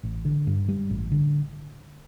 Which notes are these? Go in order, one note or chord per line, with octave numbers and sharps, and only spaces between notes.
A1
D3
G2
G3
A1
D3